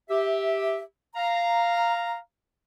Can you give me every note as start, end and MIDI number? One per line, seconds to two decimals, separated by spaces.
0.09 0.81 67
0.09 0.81 76
1.15 2.18 77
1.15 2.18 82